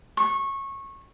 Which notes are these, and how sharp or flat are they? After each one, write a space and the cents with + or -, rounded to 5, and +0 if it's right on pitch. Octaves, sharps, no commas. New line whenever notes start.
C#6 -20